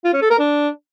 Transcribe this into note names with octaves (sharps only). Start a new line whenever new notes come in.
F4
C#4
A4
A#4
D4